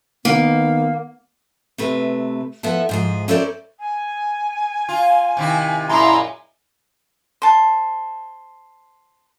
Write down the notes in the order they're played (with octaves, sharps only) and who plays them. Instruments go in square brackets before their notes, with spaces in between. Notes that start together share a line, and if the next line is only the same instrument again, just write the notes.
[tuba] D#3 [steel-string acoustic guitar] A#3 [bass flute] B3
[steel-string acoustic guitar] C3 A3 B4
F3 B3 E4 A4
G#2 F3 G#4
C#4 E4 A4 A#4 C5 D5
[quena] G#5
[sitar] F4
C3 D#3 E4
[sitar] F#2 A#2 G#3 [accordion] E4 A#5 C6
[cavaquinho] C5 A5